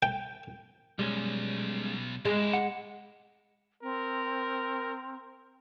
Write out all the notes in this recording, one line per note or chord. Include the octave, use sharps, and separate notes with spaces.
G5
B1 G3 G#3 C#4
G#3 E4 G4
F#5
C4 A#4